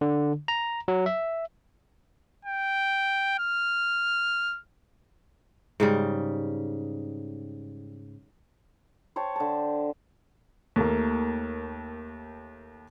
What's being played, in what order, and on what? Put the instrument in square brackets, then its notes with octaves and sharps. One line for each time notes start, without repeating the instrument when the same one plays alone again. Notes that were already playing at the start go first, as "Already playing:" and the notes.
[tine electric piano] D3
A#5
F#3
E5
[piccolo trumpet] G5
F6
[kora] G#2 C#3 G3
[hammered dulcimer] C5 C#5 G5 A5
D3 A5
[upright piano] D#2 A3 A#3